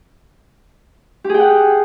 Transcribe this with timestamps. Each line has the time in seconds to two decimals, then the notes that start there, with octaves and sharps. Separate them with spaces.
1.24 G4
1.29 G#4
1.34 G5
1.39 F#5